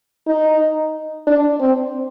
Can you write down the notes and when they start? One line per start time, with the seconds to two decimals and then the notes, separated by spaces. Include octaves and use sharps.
0.27 D#4
1.27 D4
1.60 C4